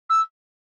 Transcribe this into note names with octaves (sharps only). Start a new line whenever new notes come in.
E6